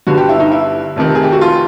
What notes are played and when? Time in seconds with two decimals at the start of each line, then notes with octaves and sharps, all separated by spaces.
0.07 G1 G2 D3 F#4
0.18 G4
0.29 E4
0.40 D#4
0.52 E4
0.96 F1 F2 C3 D#3
1.15 G#4
1.23 G4
1.32 F#4
1.41 F4